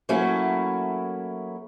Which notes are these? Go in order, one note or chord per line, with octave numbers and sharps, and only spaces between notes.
F#3 A3 A#3 C#4 E4 F#4